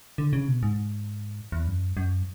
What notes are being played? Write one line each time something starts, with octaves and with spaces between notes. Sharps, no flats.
D3
C#3
B2
G#2
E2
F#2
F#2